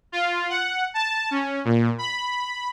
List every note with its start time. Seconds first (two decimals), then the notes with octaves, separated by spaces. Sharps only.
0.12 F4
0.49 F#5
0.94 A5
1.31 C#4
1.65 A#2
1.98 B5